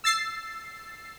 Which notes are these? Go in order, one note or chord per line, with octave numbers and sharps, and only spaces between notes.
E6 A6 C7